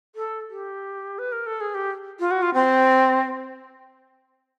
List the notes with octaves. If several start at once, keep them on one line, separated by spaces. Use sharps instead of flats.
A4
G4
B4
A#4
A4
G#4
G4
F4
F#4
F4
C4